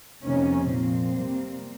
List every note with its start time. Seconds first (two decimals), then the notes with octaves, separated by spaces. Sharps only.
0.22 F2 C3 D#3 A#3 C#4
0.69 A#2 F3 A#3 C4
1.17 C3 G3 A#3